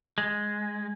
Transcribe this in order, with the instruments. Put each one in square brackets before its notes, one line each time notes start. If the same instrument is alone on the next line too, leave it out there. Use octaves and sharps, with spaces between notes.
[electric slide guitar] G#3